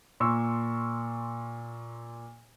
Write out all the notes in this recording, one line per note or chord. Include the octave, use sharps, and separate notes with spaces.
A#2 C6 C#6 E6